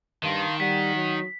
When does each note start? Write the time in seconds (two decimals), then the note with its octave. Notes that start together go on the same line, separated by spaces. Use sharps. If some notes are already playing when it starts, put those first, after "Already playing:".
0.23 G2 D#3 F5 A5 C6
0.60 G3 F#5 B6
0.95 F#3